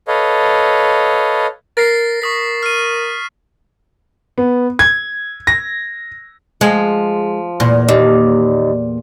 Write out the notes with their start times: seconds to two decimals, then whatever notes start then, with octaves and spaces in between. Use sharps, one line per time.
0.08 A4 B4 C#5 D#5 F5
1.77 A#4 A6 A#6 C7
2.22 A#4 C#6 D#6 B6
2.63 F6 D#7
4.38 B3
4.79 G#6
5.47 A#6
6.61 F3 G#3
7.60 E2 A#2
7.89 D#2